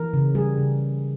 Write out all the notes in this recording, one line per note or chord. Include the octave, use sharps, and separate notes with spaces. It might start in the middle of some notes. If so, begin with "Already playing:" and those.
Already playing: E3 A#4
C#3
G3 G#4
C#3